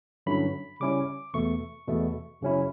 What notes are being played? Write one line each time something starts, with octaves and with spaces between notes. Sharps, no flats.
G2 D3 F#3 C#4 E4 B5
C#3 G3 C#4 E4 D6
E2 B2 A3 C#6
E2 B2 A3
F#2 C#3 F#3 C#4 E4